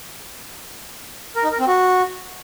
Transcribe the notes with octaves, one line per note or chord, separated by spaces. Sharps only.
A#4
D#4
A#4
C4
F#4